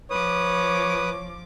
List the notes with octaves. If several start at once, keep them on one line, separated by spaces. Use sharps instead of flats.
F3 B4 C#5 D6 D#6